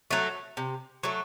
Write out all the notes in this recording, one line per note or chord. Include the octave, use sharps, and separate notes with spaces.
F#3 A3
C3
F#3 A3